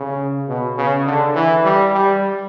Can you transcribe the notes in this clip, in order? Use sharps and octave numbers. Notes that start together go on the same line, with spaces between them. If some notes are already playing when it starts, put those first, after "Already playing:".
Already playing: C#3
B2
C#3
D3
E3
G3
G3